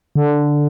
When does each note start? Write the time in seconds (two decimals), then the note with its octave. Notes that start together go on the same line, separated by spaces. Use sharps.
0.16 D3